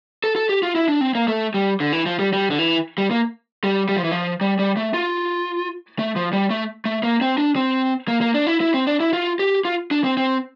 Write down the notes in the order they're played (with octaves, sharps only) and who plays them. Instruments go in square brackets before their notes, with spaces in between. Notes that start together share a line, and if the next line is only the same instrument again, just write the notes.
[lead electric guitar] A4
A4
G4
F4
E4
D4
C4
A#3
A3
G3
D3
E3
F3
G3
G3
D3
E3
G3
A#3
G3
G3
F3
E3
F3
G3
G3
A3
F4
A3
F3
G3
A3
A3
A#3
C4
D4
C4
A#3
A#3
D4
E4
E4
C4
D4
E4
F4
G4
F4
D4
C4
C4